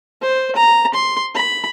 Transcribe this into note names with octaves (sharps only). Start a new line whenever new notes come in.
C5
A#5
C6
B5